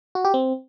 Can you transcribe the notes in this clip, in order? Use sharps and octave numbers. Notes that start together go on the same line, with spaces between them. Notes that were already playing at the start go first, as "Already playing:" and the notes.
F#4
G4
C4